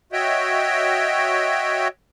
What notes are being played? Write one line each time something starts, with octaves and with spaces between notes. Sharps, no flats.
F#4 C#5 D#5 E5 G5